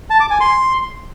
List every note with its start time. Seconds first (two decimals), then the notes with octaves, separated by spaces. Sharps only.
0.10 A5
0.20 D6
0.30 G#5
0.40 C6